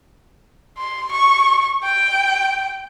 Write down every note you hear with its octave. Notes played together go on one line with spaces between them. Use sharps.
C6
C#6
G5